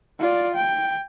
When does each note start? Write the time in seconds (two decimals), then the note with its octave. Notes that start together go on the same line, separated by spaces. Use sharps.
0.20 F4 D5
0.55 G5